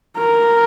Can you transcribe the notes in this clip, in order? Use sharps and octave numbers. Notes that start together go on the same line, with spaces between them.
A#4